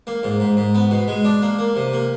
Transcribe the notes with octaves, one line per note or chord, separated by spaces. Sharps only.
A#3
G#2
G#2
G#2
B3
B2
G#3
D4
A#3
A#3
C3
A#3